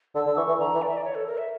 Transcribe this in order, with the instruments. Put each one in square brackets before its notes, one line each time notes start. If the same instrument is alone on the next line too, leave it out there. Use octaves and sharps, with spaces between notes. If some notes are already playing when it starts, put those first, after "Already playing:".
[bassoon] D3 [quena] E6
[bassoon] D3
[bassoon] E3 [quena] C#6
[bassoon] E3
[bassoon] D3 [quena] A#5
[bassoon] E3
[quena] D5
E5
D5
C#5
A4
A#4
E5